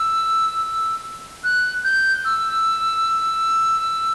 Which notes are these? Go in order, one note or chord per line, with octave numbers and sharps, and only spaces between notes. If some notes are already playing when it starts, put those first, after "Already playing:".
Already playing: E6
F#6
G6
E6